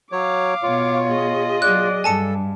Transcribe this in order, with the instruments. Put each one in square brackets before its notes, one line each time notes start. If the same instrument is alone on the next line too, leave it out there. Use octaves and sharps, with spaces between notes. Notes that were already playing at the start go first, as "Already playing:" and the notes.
[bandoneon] F#3 C#5 [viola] F5 D6
[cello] B2 C#5 [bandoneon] F4
[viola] G#4 D#5
[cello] F#3 D5 [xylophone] F#6
[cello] G2 [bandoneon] A4 [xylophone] G#5 A5 C#7